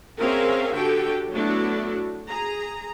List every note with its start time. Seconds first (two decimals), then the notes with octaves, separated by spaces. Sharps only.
0.20 C4 C#4 G#4 A#4 E5 F5
0.74 D3 F#4 G4 A4 G5
1.33 F#3 A3 B3 D4 E4 F#4
2.29 G#4 A#5